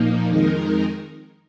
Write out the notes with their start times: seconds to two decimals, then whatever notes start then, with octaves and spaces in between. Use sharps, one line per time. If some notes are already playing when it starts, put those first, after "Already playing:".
Already playing: A#2 F3 A#3 D#4
0.28 F2 D#3 G#3 D#4 A#4